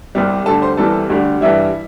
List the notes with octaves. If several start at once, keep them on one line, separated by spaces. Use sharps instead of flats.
C2 C3 G3
D2 D3 G3 A4 A5
C5 C6
C2 C3 E3 G3 A4 A5
D2 D3 G3
G2 E3 G3 E4 E5